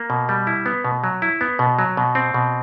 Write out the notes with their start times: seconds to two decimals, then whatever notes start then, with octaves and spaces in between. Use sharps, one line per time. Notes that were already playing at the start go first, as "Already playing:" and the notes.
Already playing: A#3
0.10 B2
0.29 G3
0.47 E4
0.66 B3
0.85 B2
1.04 F#3
1.22 E4
1.41 B3
1.59 B2
1.79 F#3
1.97 B2
2.15 C4
2.34 B2